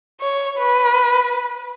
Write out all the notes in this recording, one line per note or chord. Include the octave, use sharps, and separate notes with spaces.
C#5
B4